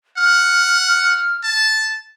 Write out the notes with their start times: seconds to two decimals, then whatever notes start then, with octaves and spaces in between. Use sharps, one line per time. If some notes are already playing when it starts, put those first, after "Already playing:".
0.17 F#5 F6
1.43 A5